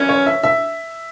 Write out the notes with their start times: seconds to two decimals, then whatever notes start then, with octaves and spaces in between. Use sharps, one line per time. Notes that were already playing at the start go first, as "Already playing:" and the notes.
Already playing: F#2 E3 C#4
0.09 C#5
0.26 E5
0.43 E5